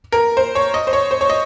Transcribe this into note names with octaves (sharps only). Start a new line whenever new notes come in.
A#4
C5
C#5
D#5
C5
C#5
C5
C#5
D#5